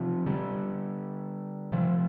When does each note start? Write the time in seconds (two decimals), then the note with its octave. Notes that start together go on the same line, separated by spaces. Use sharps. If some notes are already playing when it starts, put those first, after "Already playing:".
Already playing: C3 F3
0.26 D3 G3
1.72 C3 F3